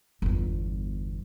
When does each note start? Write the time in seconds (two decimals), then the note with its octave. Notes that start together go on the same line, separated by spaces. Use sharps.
0.22 G1 E2